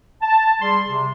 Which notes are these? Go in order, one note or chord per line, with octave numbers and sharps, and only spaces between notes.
A5
G3 G#4 C6
C3